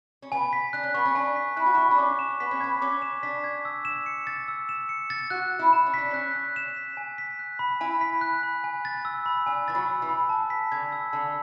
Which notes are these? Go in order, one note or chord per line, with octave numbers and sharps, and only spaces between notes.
C#4
B3 G#5
B6
D4 F#6
C#4
B3 C#6
C#4
D4 G#5
B6
E4 F#6
F#4
E4
C#6
D4
C#4 D6
E7
B3 B6
C#4
B3 G#6
C#4 D6
E7
D4 B6
G#6
E6
E7
C#7
A6
E6
E7
C#7
A6
F#4 F#6
F#6
E4
E7
C#4
D4 B6
C#4 F#6
F#6
E7
B6
G#5
B6
F#6
B5
E4 G#5
B6
F#6
B5
G#5
A6
E6
B5
D4 G#5
E3 A6
F#3
E6
E3
B5
A5
B6
D3 G#6
E6
D3 A5